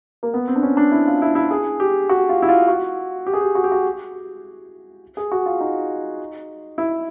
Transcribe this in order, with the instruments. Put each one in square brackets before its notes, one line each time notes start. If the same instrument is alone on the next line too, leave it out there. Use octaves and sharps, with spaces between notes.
[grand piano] A#3
B3
C4
D4
C#4
D4
E4
F4
E4
E4
G#4
G4
F#4
F4
E4
F4
F#4
G4
G#4
G4
F#4
G4
F#4
G#4
F#4
F4
D#4
E4